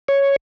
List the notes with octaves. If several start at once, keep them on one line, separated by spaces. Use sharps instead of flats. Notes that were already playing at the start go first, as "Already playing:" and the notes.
C#5